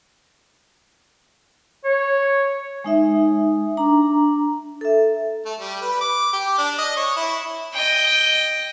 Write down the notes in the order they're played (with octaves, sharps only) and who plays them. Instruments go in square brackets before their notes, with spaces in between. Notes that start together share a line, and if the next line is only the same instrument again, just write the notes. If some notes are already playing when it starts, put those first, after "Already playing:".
[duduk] C#5
[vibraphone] G#3 D#4 E5
D4 A#5
A4 E5
[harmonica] A3
G3
B4
D6
G4
D4
D#5
C#5
E4
[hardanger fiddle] D#5 G5